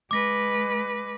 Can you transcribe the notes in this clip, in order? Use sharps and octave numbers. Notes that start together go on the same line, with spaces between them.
G#3 B4 D6 A#6